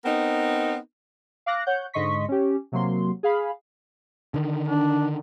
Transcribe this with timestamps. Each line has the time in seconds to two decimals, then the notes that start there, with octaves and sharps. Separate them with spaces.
0.05 B3 C4 D#4 A#4
1.46 F5 D6 F#6 A#6
1.66 C#5 F#5 G6
1.93 G#2 D3 D#5 C6 C#6 B6
2.29 C#4 G4
2.72 C3 F#3 A#3 C6
3.23 G#4 F5 B5
4.34 D3 D#3
4.68 D4